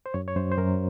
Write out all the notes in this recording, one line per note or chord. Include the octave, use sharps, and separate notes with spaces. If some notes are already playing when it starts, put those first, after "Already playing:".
C5
F#2 C#5
C#5
F#2 C5
C5
F#2 A#4